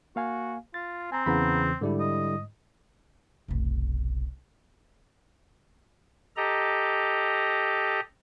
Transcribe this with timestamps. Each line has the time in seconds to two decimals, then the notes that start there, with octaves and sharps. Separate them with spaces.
0.16 A#3 F#4 F5 G#5
0.74 F4 A6
1.12 C4 G#5 A#5
1.26 E2 C#3 E3 F#5 A#5 B5
1.81 G#2 D3 G3 E4
2.00 D#5
3.48 F1 B1
6.37 G4 A4 D#5 A#5